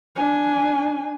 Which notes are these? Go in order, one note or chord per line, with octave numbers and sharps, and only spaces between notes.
D4 G#5